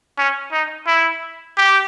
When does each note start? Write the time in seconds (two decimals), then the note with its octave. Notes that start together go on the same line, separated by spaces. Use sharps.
0.18 C#4
0.52 D#4
0.87 E4
1.57 G4